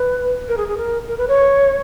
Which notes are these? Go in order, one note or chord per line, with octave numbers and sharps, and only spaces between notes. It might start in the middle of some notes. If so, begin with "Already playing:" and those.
Already playing: B4
A#4
G#4
G#4
A#4
A#4
B4
C#5